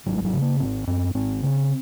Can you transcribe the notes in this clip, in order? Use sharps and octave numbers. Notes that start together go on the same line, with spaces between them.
G#1 F#3
G#3
F#3
C#3
A#3
G#1 C4
F#2 C4
G#1 C4
C#3